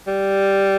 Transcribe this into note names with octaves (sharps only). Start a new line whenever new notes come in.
G3